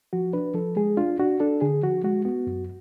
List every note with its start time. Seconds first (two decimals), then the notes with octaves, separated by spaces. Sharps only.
0.13 F3 F#4
0.33 D4 B4
0.54 F3 A4
0.76 G#3 G#4
0.97 D4 F4
1.19 D4 F#4
1.40 D4 A4
1.61 D3 G#4
1.82 F3 F#4
2.04 G#3 F#4
2.25 B3 F#4
2.47 F#2